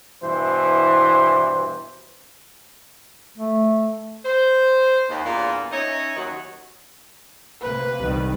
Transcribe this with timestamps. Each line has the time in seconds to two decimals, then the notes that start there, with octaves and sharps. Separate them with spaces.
0.23 G2 B2 E3 E4 C5
3.38 A3
4.25 C5
5.09 D#2
5.24 E2 G2 A#2
5.71 C#4 D#4 C#5 D#5 E5
6.16 D#2 D#3 F#3
7.61 C3 A#3 B4
8.00 C2 D#3 G3